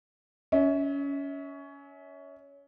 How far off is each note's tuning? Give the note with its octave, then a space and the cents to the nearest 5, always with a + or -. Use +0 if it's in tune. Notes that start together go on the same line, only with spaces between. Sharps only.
C#4 +20 E5 -35